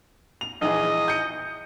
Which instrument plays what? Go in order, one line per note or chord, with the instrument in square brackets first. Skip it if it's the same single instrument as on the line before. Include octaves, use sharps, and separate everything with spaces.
[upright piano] F7
[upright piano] A#1 E3 G#4 [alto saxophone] D#5
[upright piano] G6 C#7